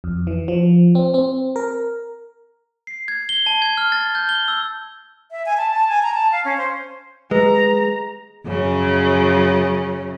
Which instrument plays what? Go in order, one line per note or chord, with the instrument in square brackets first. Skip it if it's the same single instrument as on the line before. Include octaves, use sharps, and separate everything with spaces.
[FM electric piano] F2
E3
F3
C4
C4
A#4
[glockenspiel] C7
G#6
G7
A5
G#6
F6
A6
G6
G7
E6
[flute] E5
G#5
A5
A5
G#5
A#5
A5
F5
C#4
C5
[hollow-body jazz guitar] G#3 [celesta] B4 [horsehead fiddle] A#5
[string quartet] F#2 C#3 C#4